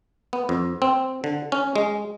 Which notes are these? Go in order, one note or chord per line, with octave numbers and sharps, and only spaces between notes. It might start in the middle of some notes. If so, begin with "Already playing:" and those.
B3
F2
C4
D3
C#4
G#3